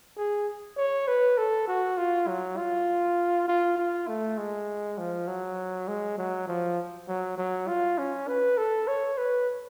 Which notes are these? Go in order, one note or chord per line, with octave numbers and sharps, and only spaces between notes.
G#4
C#5
B4
A4
F#4
F4
F#3
F4
F4
F4
A3
G#3
F3
F#3
G#3
F#3
F3
F#3
F#3
F4
C#4
B4
A4
C#5
B4